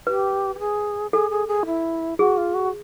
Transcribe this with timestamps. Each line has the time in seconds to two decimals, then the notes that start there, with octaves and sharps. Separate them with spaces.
0.07 G4 B4
0.55 G4
0.59 G#4
1.13 G#4 A4
1.31 G#4
1.48 G#4
1.66 E4
2.19 F#4 G#4
2.37 F4
2.54 F#4